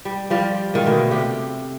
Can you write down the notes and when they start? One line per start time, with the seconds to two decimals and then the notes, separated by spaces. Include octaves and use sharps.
0.05 G3
0.30 F3 G3 F4 D5
0.74 G#2 D#3 F4
0.86 B2 D3 A3
1.11 C3 G4